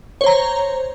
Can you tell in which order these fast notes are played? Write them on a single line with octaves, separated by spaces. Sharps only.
C#5 C5 A#5